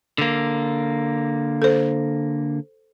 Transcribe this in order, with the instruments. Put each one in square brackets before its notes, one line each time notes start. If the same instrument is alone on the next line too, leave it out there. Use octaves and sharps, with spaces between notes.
[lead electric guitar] D3 A#3
[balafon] A4 C5